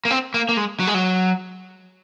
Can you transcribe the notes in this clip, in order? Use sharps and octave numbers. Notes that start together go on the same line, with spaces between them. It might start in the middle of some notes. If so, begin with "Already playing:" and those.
A#3
C4
A#3
A#3
G#3
F#3
G#3
F#3